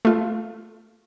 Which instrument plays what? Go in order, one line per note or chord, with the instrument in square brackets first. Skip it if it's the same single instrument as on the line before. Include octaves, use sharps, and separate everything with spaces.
[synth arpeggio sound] A3 F4